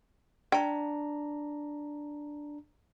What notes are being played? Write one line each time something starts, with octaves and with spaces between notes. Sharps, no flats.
D4 G5 A#5